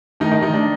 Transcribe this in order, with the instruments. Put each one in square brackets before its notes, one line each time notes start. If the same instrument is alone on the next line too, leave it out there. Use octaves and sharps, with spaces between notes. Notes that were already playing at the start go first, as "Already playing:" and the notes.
[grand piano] D#3 D#4 [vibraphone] A3
[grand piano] D#3 D#4
[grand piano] D#3 D#4 [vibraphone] A3
[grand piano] D4